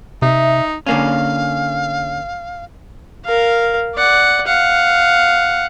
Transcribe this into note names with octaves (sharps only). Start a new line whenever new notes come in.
C3 D#4 E5
D3 A#3 C#4 F5
A#4 F5
D5 F#5
F5 F#5